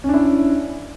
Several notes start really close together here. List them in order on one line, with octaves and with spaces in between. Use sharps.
C#4 D4 E4